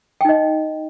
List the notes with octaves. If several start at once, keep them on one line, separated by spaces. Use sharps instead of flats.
D#4 D#5 G5